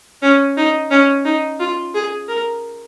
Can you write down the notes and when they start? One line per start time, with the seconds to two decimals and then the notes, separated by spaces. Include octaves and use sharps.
0.22 C#4
0.57 D#4
0.90 C#4
1.25 D#4
1.60 F4
1.94 G#4
2.28 A#4